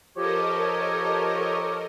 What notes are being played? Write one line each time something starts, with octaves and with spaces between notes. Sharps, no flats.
F3 G4 A4 A#4 C#5 D#5